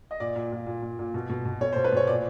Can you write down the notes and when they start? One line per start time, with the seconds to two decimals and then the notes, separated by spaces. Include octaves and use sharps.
0.11 D#5
0.20 A#2 D5
0.36 A#2
0.52 A#2
0.67 A#2
0.82 A#2
0.99 A#2
1.14 B2
1.30 B2
1.45 B2
1.61 B2 C#5
1.73 C5
1.76 B2
1.84 B4
1.92 B2 C#5
2.07 A#2 D5